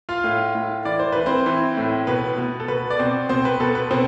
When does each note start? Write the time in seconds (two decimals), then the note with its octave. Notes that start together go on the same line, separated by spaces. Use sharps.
0.09 F4 F5
0.24 A2
0.55 A2
0.85 E3 D5
0.99 C5
1.12 E3 B4
1.26 C4 C5
1.46 E3
1.77 A2
2.07 B2 B4
2.38 B2
2.60 A4
2.68 B2 B4
2.90 D5
2.99 B2 C4 C5
3.29 B2 C4 C5
3.45 B4
3.60 B2 A4
3.75 B4
3.91 B2 C4 C5